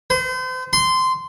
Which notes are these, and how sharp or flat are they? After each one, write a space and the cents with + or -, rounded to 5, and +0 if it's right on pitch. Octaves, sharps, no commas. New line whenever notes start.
C5 -40
C6 -15